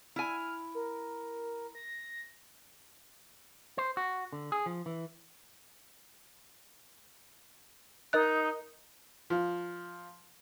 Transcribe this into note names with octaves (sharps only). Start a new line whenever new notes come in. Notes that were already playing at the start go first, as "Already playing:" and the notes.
E4 G#5 F6
A#4
A#6
C5
F#4
D3
G#4
F3
E3
D#4 A#4 D#5 F#6
F3